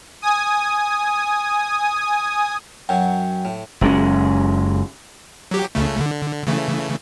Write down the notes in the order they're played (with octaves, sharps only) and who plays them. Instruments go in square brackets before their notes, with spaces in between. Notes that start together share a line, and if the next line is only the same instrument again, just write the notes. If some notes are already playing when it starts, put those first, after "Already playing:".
[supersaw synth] G#5 D#6
[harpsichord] F#2 F#3 [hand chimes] G5
[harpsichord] A2
[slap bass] F#1 G#3 C#4
[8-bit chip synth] F#3 G4
C#2 C#3 A3
D3
C#3 E3 A3